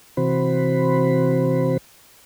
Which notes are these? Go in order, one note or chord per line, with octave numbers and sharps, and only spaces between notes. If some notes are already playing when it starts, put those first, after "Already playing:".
C3 E3 C4 F#4 C5 B5